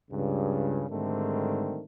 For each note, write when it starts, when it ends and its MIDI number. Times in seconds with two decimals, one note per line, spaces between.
0.11 0.85 37
0.11 0.85 43
0.11 0.85 49
0.90 1.83 44
0.90 1.83 50
0.90 1.83 51
0.90 1.83 55
0.90 1.83 57
0.90 1.83 60